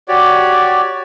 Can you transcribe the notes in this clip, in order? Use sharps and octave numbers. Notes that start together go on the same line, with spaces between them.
F#4 G4 C#5 D5